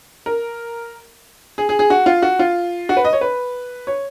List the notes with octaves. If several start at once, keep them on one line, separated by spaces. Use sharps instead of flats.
A#4
G#4
G#4
G#4
F#4
F4
F#4
F4
F#4
B4
D#5
C#5
B4
C#5